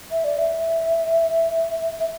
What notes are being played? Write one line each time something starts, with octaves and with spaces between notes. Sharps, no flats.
E5
D5
E5
E5